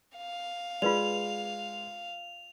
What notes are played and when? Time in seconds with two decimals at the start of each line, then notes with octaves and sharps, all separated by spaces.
0.17 F5
0.82 G#3 F4 B4 D5 F7